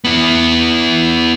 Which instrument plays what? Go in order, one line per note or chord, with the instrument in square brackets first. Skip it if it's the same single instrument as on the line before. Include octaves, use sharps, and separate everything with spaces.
[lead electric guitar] B3 E4